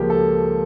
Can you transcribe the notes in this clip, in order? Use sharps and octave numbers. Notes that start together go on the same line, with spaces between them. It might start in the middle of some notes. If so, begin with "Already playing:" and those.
Already playing: C#2 C#3 F3 A#3 G4
A4